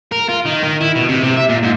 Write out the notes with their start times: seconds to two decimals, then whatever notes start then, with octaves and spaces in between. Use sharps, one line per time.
0.12 A#4
0.29 F4
0.45 D#3
0.63 D#3
0.81 E4
0.96 B2
1.09 C3
1.24 C3
1.37 E5
1.50 A#2
1.63 G#2